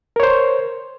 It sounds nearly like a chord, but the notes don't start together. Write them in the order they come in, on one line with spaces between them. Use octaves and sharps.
A#4 C#5 C5